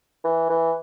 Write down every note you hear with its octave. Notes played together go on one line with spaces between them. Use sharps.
E3
E3